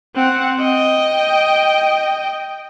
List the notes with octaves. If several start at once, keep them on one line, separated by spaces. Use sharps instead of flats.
C4 F#5
D#5 G5